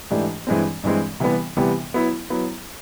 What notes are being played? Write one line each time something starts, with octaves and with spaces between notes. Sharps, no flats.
G#2 E3 A3 D4 G4
G2 E3 G#3 C4
G2 E3 G#3 C4
C3 E3 G3 B3
C3 E3 G3 B3
F#3 B3 E4
F#3 B3 E4